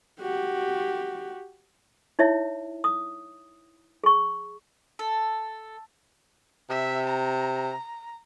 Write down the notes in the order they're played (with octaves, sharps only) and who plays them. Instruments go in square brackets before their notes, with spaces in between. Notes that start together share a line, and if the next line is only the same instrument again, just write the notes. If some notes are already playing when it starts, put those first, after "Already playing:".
[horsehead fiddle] F#4 G4
[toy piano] D#4 E4 C#5 E5
D#6
G#4 C#6
[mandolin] A4
[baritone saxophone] C3 [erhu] E5
[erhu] A#5